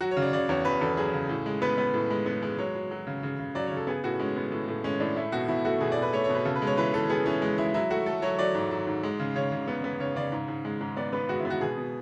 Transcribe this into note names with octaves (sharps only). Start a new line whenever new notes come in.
F#3 F#4
C#5
C#3
D5
C#3 D5
E2 C#5
E2 B4
E2 A4
F#3 G#4
C#3
A2
G#3
B3 B4
B3
A2
G#3
B3
G#3
F#3 C#5
F#3
F#3
C#3
C#3
C#3
F#3 D5
C#3 C#5
A4
B3 G#4
A2 F#4
G#3 C#4
B3
A2
A2
G#3 C#4
A2 D4
A3 E4
B2 F#4
B2 E4
A3 F#4
B2 G#4
D5
B2
B4
A3 C#5
C#5
B2 B4
C#3 A4
B4
G#3
C#5
E3 B4
E3 A4
B3 G#4
E3 C#4
G#3
G#3 E4
F#3 E4
A3 F#4
A3 A4
F#3 C#5
F#3 D5
G#2
F#3
G#2
G#3
C#3
C#3 C#5
C#3
B3
B3
C#3 C#5
C#3 D5
G#2
G#2
G#3
G#2
B3 D5
B3 B4
G#3 F#4
E4
B3
F#4
B2 G#4
B2